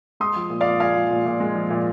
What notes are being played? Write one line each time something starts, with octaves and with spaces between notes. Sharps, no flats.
G#3 C6 D#6
F3
A#2
A#2 D5 F5
G#3 F5 G#5
F3
A#2
A#2
G#3
F3
A#2